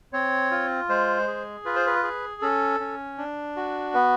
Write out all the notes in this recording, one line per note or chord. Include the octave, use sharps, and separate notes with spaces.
C4 C#5
F4
G#3 C5
G#4
F4 B4
C5
B4
G#4
C#4 A4
C#4
D4
F#4
B3 B4